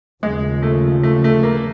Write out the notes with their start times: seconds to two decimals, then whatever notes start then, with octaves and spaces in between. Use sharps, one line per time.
0.23 D#2 C#3 F3 G#3
0.63 A3
1.03 A3
1.24 A3
1.43 A#3